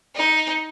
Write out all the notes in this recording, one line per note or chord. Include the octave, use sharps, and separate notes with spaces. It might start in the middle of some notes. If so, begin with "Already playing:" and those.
D#4